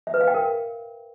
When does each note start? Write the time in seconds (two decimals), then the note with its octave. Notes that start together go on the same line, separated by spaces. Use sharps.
0.07 E5
0.14 B4
0.21 F5
0.27 G5
0.34 A#4